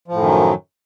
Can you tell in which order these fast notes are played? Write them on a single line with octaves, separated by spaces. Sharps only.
F3 A2 F#2 D#3 F#3